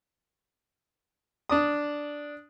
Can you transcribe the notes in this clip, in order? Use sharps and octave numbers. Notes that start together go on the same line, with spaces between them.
D4 D5 D#6